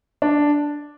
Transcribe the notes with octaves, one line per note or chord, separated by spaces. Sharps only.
D4